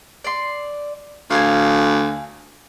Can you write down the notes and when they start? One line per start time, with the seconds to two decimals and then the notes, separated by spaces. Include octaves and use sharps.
0.24 D5 C6
1.30 D2 F5 G#5